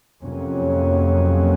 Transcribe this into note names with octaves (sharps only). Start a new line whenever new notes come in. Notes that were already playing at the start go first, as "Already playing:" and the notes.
F2 C3 F#3 A#3 C#4